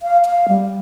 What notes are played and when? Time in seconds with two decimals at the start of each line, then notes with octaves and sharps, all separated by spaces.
0.02 F5
0.26 F5
0.48 G3